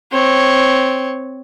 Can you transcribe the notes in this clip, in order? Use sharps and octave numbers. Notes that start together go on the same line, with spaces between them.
C4 C#5